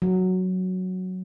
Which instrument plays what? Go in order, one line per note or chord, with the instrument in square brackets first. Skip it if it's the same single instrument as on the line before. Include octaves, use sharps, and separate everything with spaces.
[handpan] F#3